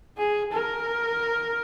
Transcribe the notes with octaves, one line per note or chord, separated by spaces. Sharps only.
G#4
A#4